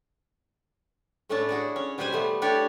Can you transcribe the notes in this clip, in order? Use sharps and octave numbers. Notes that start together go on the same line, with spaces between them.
A2 A3 C#4 D4 E4 A5
F#4 G#4 D5
C#4
B2 G3 G4 B4 C5 G#5
G3 A3 B3
D4 E4 G4 A4 C#5 D5